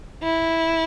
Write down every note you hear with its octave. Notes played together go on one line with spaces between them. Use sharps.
E4